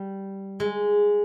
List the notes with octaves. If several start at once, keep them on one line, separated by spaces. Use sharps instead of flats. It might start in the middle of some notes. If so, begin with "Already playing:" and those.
Already playing: G3
G#3